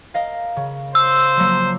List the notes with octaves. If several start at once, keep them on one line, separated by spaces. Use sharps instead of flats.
A#4 D#5 F5
C#3
C5 E6
F3 F#3 A#3